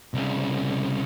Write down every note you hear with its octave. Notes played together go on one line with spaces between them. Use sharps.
C2 C#3